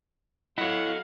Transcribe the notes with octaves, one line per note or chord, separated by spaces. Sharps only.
F#3 E4 A4 C#5 D#5 F5 F#5